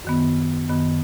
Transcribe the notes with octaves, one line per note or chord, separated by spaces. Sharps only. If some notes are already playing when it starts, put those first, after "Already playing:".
F#2 D#3 B3
F#2 D#3 B3